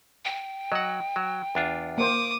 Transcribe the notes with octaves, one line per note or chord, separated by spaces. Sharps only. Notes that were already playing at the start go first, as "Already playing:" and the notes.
G5
F#3 D#5 F#5
F#3
E2 D4 F4
A#3 C5 D6 D#6